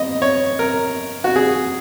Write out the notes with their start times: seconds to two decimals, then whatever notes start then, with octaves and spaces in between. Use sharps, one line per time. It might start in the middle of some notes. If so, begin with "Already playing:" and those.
Already playing: D#5
0.22 C#5
0.59 A#4
1.24 F#4
1.36 G#4